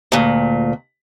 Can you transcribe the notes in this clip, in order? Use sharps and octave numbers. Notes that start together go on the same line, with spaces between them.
D2 A#2